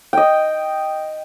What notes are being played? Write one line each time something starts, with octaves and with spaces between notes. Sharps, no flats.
D#5 G5